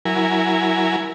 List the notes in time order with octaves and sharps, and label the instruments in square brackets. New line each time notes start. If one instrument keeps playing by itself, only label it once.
[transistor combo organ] F#3 E4 A#4 G#5